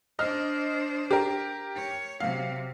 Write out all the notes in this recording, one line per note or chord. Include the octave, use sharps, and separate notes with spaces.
D4 C5 D#5 F6
G4 A#4
C#5
C3 F#3 F5